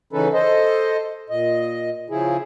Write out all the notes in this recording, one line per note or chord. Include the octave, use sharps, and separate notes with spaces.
C#3 E3 C#4 D#4 A4 B4
A4 C5 D#5
A#2 D#5
C#3 F3 E4 G#4